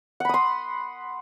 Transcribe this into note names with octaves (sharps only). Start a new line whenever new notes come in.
F#5 B5 C6 D#6